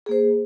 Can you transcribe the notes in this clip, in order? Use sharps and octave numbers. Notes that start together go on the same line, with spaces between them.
A#3 G#4 C5